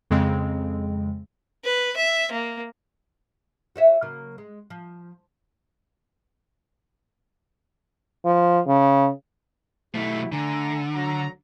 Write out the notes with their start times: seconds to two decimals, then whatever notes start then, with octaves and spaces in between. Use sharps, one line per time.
0.11 F2 C#3 G#3 C4
1.65 B4
1.96 E5
2.32 A#3
3.76 F#4 C#5 E5
4.03 C#3 F#3 A#3
4.38 G#3
4.70 F3
8.25 F3
8.67 C#3
9.94 B1 A3 E4 F#4 G4
10.32 D3 A3 G#5 A#5
10.94 D2 F#3 A#5